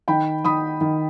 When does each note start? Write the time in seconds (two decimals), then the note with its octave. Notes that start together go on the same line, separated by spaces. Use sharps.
0.08 D#3 G5 B5
0.45 D#3 B5 D#6
0.81 D#3